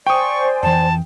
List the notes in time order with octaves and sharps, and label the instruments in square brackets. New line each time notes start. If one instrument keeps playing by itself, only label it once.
[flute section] C5 D5 G#5 [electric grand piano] G5 D#6 [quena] C#6
[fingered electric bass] F2 E3 [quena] A5